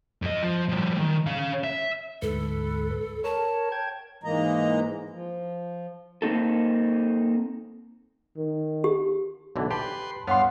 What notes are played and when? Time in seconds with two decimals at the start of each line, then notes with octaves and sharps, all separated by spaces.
0.22 F2 D#5
0.42 F3
0.69 F3 G3
0.98 D#3
1.27 C#4 F5
1.64 E5
2.22 D2 G#2 A4 B4
3.24 A#4 C#5 A5
3.72 G5 G#6
4.24 G#2 E3 G#3 A#3 D#5 A#5
5.10 F3
6.22 A#3 C4 D#4 A4
8.36 D#3
8.84 G4
9.56 B1 D3 E3
9.71 G4 B4 A5 C6
10.27 G2 B3 C#5 F5 F#5 C6